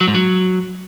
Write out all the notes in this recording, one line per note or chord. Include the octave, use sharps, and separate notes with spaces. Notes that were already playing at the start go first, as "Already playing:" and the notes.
F#3
G#2
F#3